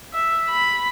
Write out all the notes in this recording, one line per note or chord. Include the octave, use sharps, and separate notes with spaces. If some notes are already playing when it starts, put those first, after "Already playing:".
E5
B5